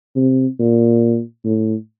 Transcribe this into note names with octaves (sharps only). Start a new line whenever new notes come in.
C3
A#2
A2